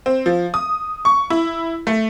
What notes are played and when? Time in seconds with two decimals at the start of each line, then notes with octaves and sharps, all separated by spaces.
0.06 C4
0.26 F3
0.54 D#6
1.05 C#6
1.30 E4
1.87 A3